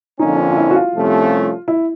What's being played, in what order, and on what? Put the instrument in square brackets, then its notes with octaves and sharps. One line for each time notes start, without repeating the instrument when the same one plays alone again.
[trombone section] F2 D3 F3 A#3 C#4 [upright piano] D#4
[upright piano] F4
E4
F#4
F4
[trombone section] C2 C3 F3 A3 C#4
[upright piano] E4